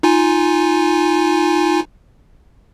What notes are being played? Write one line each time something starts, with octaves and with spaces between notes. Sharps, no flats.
D#4 F4 G#5